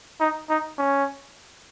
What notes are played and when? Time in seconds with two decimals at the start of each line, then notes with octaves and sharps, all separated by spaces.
0.20 D#4
0.49 D#4
0.78 C#4